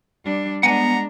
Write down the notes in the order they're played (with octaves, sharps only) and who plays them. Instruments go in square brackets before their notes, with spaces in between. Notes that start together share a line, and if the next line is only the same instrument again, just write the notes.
[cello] G3 D4
[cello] G#3 D4 [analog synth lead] B3 [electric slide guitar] F#5 G#5 [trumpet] A#5